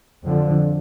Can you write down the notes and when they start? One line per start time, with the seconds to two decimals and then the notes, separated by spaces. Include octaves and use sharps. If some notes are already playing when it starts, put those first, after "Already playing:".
0.23 F2 D3 F3